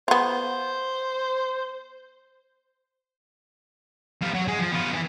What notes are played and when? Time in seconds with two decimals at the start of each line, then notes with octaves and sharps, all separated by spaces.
0.08 B3 F4 C5
4.21 G3 F4
4.34 F#3
4.48 G#3
4.59 F3
4.72 B3 F4
4.93 D#3 E3